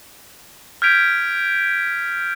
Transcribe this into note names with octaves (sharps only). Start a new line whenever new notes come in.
F6 G6 G#6 B6 D7 F7